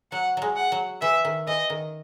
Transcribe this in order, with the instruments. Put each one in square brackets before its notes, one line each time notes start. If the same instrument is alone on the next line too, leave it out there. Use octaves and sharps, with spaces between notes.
[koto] F#3 [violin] F#5
[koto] F#3 G#3
[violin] F#5
[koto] F#3
[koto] E3 [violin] E5
[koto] D#3
[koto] E3 [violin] D#5
[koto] D#3